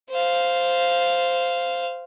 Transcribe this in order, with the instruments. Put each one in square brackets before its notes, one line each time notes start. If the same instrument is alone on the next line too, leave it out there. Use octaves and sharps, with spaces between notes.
[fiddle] C5 F5